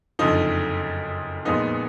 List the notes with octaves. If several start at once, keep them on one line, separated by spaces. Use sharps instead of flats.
F#1 F2 D3 F3 D#4
A#1 A#2 F3 G#3 B3 D#4